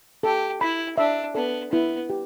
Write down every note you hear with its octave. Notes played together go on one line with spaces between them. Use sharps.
G4 A4
E4 B5
D4 E5
B3 A4
B3 E4
G4